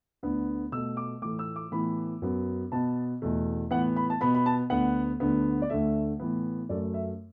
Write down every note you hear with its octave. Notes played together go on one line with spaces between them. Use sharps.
D2 D3 B3
B2 A3 E6
D6
A2 E3 A3 D6
E6
D6
A2 E3 B3 B5
F#2 F#3 B3
B2 B3 A5
E2 B2 A3
A2 E3 B3 F#5
B5
A5
B2 B3 B5
B5
A5
D2 D3 B3 F#5
D2 D3 B3
D5
D2 D3 A3 E5
A2 E3 B3
F#2 F#3 A3 D5
E5